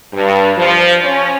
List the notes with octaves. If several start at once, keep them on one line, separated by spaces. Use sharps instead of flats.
G2
F3
C#4